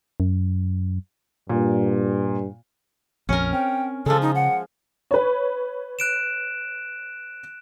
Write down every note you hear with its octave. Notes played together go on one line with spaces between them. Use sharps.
F#2
G2 A#2
A#1 F2 C#4 A#4
C4 G5
C#3 F3 G#3 A4
D#4
F#5
B4 C#5
F#6 D7 E7